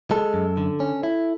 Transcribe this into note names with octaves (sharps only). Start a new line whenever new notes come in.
G#3 A4
F#2
D3
C#4
E4